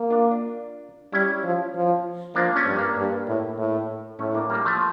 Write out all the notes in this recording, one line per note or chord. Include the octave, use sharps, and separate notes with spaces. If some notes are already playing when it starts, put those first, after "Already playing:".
Already playing: A#3
D4 F4
D4 F4
G3 C#4 E4
F3
F3
F3 A#3 D4
A3 C#4
G2
A#3 D4
G2
A2
A2
A2 A3 C#4
A#3 D4
G3 A#3
F3 A3